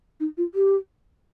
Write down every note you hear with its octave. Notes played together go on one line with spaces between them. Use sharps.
D#4
F4
G4